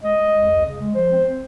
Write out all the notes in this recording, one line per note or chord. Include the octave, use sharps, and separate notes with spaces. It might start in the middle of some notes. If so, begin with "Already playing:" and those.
G#3 D#5
G#3
F2
C#2
C#3
G#3
F3 C5
C4
C4